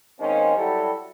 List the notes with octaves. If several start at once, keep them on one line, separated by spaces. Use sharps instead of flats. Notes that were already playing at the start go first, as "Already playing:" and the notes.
D#3 G#3 A#3 C4 C#4 D#4
F#3 G3 E4 F#4 G4 A4